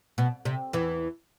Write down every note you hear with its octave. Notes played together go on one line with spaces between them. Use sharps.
B2
C3
E2 E3